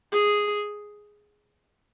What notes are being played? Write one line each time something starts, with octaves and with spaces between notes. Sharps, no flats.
G#4